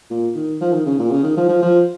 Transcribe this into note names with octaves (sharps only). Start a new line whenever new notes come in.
A#2
D#3
F3
D#3
C#3
A#2
C#3
D#3
F3
F3
F3